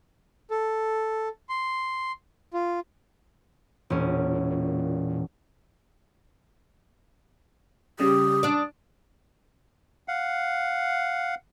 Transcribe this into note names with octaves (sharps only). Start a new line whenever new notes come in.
A4
C6
F4
E1 A#2 C#4
C#3 G3 G4 D#6
D4 D5
F5 F#5